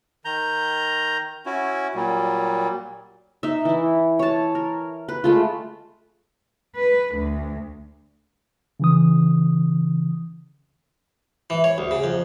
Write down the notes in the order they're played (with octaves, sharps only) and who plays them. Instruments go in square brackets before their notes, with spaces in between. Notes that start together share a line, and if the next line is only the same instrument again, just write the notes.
[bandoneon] D#3 A#5 G6
C#4 E4 F#4
A#2 F#3 G3
[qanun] D#4 E5
E3 E4
C#5 A5
A#4
B4
G#3 A3 F4
[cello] B4
D2
[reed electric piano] C#3 E3 D#6
[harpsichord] E3
C#5
D2
C#3
F2